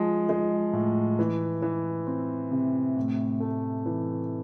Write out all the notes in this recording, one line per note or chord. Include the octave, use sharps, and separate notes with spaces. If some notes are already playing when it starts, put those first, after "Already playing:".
Already playing: F3 G#3
G#3
A2
E3
E3
C4
C3
A2
A3
E3